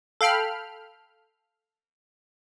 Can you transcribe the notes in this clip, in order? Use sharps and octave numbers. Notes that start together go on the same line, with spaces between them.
A4 F5 G5 B5 F6